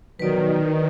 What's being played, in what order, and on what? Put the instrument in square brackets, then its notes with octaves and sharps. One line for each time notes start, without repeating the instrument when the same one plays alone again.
[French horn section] B2 F3 F#3 [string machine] D#3 [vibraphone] B4 D5